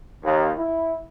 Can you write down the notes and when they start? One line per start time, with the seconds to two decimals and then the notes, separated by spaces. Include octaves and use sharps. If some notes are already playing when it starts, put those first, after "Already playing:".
0.24 D#2
0.58 E4